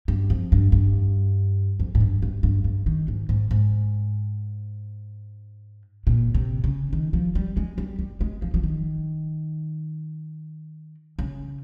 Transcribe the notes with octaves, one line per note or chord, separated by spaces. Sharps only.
G2
F2
G2
G2
F2
G#2
G2
G2
G2
G2
D#3
G#2
G#2
G#2
A#2
C3
C#3
D#3
F3
G3
G#3
G3
G3
G#3
F3
F3
D#3
C#3